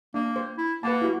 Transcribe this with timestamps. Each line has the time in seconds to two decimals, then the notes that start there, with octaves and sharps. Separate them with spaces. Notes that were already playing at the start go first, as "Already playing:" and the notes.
0.14 A#3 D4
0.36 C5
0.58 E4
0.83 A#3 B4 F#5 A5
1.02 E4 F#4